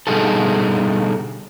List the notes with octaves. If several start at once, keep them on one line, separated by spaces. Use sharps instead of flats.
B2 D3 G3 D#4 G#4 A4